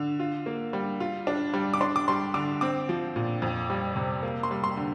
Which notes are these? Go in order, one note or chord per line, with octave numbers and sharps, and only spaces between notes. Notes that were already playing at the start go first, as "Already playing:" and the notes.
Already playing: D3
F4
A#3
G3
F4
D4
G3
D6
D4 C6
D6
G3 C6
D3 D6
C4 D6
F3
A#2
F2
G3
C3
A#3
C6
G3
C6
D3